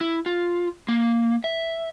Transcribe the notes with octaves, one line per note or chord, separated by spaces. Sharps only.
E4
F4
A#3
E5